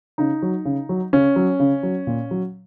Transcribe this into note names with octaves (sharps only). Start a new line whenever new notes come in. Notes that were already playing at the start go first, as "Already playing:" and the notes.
C#3 D#4
F#3
C#3
F#3
C#3 C#4
F#3
C#3
F#3
A#2
F#3